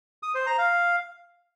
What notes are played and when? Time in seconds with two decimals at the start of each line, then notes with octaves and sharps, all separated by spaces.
0.23 D#6
0.35 C5
0.47 A#5
0.58 F5